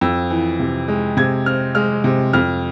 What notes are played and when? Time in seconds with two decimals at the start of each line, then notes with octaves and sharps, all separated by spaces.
0.01 F2 E6
0.30 E3
0.60 C3
0.88 G#3
1.17 C3 G#6
1.46 C4 F6
1.75 G#3 F6
2.04 C3
2.33 F2 F6